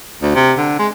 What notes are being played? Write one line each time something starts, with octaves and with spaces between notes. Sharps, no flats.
D2
C3
D3
G#3